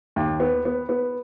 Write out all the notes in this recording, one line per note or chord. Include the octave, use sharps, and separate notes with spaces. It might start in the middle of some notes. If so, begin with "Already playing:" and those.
D#2
B3
B3
B3